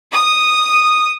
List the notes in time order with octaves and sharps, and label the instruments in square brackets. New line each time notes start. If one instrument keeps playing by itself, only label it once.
[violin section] D#6